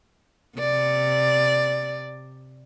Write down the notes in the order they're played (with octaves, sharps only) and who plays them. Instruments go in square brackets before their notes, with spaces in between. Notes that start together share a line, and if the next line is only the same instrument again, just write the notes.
[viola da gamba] C3 D5